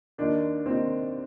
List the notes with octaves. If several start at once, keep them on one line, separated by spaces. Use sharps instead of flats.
D#2 D#3 D4
D#2 D#3 C4